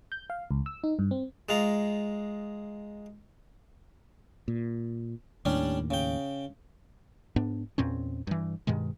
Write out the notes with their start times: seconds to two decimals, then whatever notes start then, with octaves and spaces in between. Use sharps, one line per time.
0.12 G6
0.30 F5
0.51 C#2
0.66 E6
0.84 D#4
0.99 G2
1.11 C4
1.49 G#3 F4 A#5
4.48 A#2
5.45 D#2 A2 G3 C#4 D4
5.91 C#3 G5
7.36 G#2 B3 D4
7.78 E2 A#2 C4 C#4
8.27 G2 E3
8.67 G2 B2 D#3 G#3